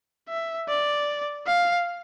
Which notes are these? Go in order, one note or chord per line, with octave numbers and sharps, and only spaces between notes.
E5
D5
F5